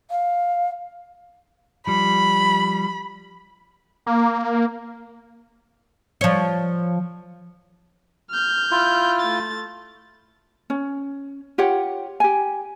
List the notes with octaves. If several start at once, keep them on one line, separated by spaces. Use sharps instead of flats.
F5
F3 G3 B5
A#3
F3 C#5
F6 G6
E4 F4
A3 A6
C#4
F4 G4 C#5 F#5
G4 G#5